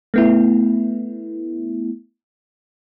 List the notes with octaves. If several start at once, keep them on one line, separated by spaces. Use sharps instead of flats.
A3 B3 E4